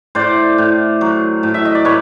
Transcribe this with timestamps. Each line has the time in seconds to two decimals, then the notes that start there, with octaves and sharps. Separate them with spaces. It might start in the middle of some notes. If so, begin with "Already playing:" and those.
0.15 A2 C5 D5
0.58 A2
1.01 F#3
1.43 A2
1.54 E5
1.65 D#5
1.75 D5
1.85 A2 B4 C#5